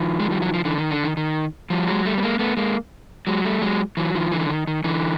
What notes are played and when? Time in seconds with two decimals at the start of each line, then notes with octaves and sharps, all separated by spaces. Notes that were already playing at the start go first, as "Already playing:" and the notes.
Already playing: D#3 F3
0.20 G#3
0.31 G3
0.42 F#3
0.54 F3
0.65 D3 E3
0.78 D#3
0.91 D3
1.04 D#3
1.17 D#3
1.70 F3 G3
1.87 F#3 G#3
2.05 G3 A3
2.18 B3
2.23 G#3 A#3
2.39 A3 B3
2.57 G#3 A#3
3.27 F#3 G#3
3.45 G3 A3
3.62 F#3 G#3
3.97 E3 F#3
4.15 D#3 F3
4.32 D3 E3
4.49 D#3
4.67 D#3
4.84 D3 E3